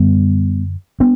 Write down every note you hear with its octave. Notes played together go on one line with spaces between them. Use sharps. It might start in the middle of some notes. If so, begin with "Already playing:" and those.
Already playing: F#2 D3 G3 B3
B3 D4